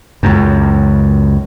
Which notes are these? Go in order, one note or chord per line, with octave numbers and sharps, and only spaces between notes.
C#2 F#2